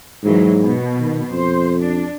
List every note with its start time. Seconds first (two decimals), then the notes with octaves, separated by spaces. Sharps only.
0.23 G#2 E3 F#3 A#3
0.62 B2
0.99 D#3
1.31 F2 C5
1.81 D4